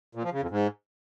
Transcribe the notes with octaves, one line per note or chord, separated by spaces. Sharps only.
A#2
F3
C#3
F2
G#2